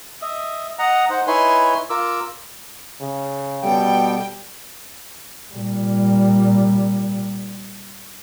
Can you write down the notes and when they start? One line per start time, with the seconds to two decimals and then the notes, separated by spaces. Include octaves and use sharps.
0.22 D#5 E5
0.79 D#5 F#5 A#5
1.10 D#4 C5 F#5
1.27 D#4 E4 B4 C#5 G#5 C6
1.90 F4 A#4 D6 E6
3.01 C#3
3.64 B2 G3 B3 A4 G5
5.54 A#2 G3